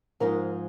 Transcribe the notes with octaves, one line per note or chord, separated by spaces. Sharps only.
G#2 F3 G#3 D#4 A#4